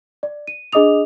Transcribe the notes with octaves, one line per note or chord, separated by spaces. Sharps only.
D5
D#7
D4 G#4 D#5 D6 D#6 F7